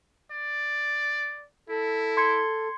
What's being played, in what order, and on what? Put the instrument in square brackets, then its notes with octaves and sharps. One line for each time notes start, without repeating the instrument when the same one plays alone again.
[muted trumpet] D5
[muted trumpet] E4 [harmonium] A4
[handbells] C6 G#6 C#7